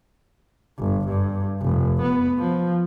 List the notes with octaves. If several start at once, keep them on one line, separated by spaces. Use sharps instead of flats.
G1
G2
F1
B3
F3